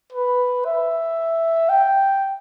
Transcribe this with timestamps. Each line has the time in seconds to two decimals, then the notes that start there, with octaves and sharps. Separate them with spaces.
0.12 B4
0.65 E5
1.69 G5